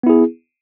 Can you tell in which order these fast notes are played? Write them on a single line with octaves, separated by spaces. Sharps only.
B3 E4 G#4